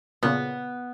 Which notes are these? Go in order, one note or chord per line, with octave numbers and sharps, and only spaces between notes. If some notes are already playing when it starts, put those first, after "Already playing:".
A#2 C#3 B3